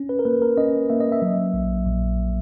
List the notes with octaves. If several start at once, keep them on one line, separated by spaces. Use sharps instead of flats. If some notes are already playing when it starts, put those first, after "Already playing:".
Already playing: C#4
B4
A#4
A#3 B4
A#4
C#4 D#5
A#3 E5
D#5
E5
F#3
A#1
A#1